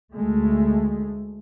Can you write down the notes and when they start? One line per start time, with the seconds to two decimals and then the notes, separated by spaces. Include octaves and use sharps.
0.15 D2 G#3 A3